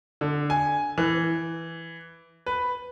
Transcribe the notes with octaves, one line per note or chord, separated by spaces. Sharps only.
D3
G#5
E3
B4